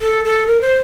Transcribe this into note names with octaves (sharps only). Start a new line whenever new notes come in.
A4
A4
A#4
C5